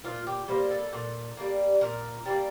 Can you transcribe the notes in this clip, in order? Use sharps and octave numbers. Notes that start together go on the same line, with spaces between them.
A#2 F4
G4
G3 A#3 C5
A4
A#2
G3 A#3
A#2 A#4
G3 A#3